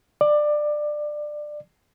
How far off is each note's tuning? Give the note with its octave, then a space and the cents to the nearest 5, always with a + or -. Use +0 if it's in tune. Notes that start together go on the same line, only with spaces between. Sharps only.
D5 +20